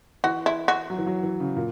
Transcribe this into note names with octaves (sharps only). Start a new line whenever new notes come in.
E3 F#4
E4
F#4
F#3
E3
F#3
E3
C#3
A#2